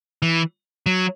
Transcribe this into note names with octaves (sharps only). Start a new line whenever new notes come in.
E3
F#3